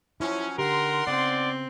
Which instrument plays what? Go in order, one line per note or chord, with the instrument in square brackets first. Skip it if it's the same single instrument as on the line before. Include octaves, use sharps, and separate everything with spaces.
[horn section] F3 F#3 C#4 [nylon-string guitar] E4
[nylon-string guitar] D3 G4 [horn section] D#4 F#5 C6 [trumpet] A#4
[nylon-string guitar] C#3 B3 [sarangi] C4 [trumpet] D5